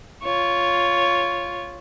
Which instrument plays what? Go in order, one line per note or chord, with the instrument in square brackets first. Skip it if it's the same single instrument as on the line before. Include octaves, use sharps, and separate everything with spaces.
[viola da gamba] F4 C#5